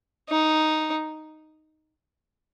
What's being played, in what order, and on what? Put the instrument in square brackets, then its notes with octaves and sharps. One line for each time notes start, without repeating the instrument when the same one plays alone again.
[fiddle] D#4